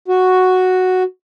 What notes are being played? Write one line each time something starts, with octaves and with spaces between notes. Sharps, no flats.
F#4